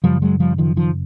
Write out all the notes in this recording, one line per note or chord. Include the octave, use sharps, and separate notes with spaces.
F#2 C#3 F3 G3
F#3 G#3
F3 G3
D#3 F3
D#3 F3